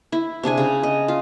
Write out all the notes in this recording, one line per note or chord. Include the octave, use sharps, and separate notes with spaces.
E4
C3 D4 G#4 G#5
C#3
D#5
F4